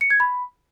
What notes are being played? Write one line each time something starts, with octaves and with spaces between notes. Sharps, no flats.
C#7
G#6
B5